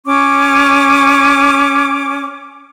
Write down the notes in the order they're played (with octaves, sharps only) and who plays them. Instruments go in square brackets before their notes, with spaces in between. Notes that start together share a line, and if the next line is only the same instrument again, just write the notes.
[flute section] C#4 C#6 D6